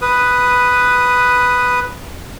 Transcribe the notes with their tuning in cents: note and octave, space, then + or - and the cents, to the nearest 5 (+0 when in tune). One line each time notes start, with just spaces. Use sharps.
B4 +0 D#6 -5